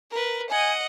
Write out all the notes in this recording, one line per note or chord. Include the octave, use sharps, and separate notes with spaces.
A#4 B4
D#5 F#5 G#5